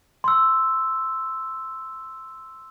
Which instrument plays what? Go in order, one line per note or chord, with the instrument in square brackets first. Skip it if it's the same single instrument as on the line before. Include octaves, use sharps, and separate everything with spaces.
[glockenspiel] C6 E6